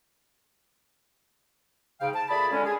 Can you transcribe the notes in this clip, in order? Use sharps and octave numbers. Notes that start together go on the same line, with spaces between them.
G#2 C#3 F5 G5
A5
A#2 A3 G#4 D5 B5
D3 G#3 C#4
G#4